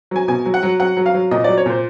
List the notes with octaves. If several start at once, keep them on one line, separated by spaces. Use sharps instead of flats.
F#3 G#5
B2 G#5
F#3
F#5
F#3
F#3 F#5
F#3
F5
F#3
A#2 D#5
F#3 D5
C#5
A#2 C5